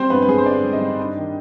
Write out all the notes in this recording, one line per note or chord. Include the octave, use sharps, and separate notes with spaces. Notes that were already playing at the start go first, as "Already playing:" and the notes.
Already playing: G3 C4 C5
G2 B3 B4
B4
G2 G#4
C5
D3 D4 D5
G3
D#4 D#5
G2
D4
D#3